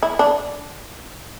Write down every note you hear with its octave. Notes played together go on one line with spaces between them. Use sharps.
E4
D4